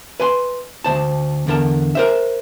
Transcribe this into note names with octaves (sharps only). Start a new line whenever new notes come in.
B4 G#5 C6
D2 C5 A5
E2 D3 A#4 A5
A#4 C5 E5